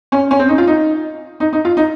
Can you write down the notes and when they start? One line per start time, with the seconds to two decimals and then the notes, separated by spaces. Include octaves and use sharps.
0.12 C#4
0.31 C#4
0.39 C4
0.49 D#4
0.58 F4
0.67 D#4
1.40 D#4
1.53 D#4
1.65 F4
1.77 D#4